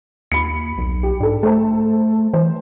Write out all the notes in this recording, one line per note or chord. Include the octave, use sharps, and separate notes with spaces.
D#2 B5 C#7
B1
G4
G#2 D4 A4
A3 A4 C5 A5
E3 C5